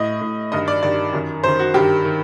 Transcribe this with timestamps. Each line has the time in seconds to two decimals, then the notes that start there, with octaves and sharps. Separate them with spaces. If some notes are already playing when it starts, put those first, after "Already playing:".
Already playing: A2 D#5
0.21 A2
0.52 G2 D#3 D#5
0.68 D5
0.83 G2 D#3 D5
1.13 F#2 D#3
1.44 F#2 D#3 C5
1.59 F#4
1.74 G2 D#3 G4
2.05 D#3